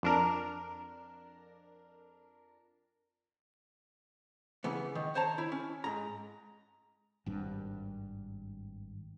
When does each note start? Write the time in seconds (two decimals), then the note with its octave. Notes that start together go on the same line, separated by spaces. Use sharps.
0.03 F2 D4 A#4
4.64 C#3 E3 B3
4.95 D#3
5.15 C5 C#5 A5 A#5
5.38 E4
5.52 C#4
5.84 G#2 A#5
7.26 G#1 G2